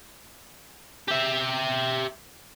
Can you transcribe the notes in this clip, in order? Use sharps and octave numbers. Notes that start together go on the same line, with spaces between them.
G4 E5